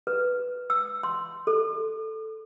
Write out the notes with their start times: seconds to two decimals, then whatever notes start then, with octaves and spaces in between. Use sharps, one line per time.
0.07 B4
0.70 E6
1.03 C6
1.47 A4